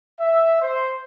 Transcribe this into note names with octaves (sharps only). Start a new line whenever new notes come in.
E5
C5